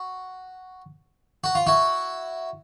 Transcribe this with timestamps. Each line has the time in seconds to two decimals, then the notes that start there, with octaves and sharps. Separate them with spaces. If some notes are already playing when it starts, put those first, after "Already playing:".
Already playing: F#4
1.44 F#4
1.55 F4
1.67 E4 F#4